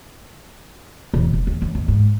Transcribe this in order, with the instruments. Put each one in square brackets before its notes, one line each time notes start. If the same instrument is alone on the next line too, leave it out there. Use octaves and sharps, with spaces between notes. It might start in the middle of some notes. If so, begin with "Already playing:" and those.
[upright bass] E1
F1
D#2
F#2
D#2
G#2